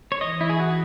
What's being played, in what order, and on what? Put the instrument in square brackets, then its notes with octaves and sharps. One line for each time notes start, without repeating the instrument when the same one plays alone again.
[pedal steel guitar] C#5
[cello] E3 [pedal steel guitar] D#5
[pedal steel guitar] E4
G#4
F#4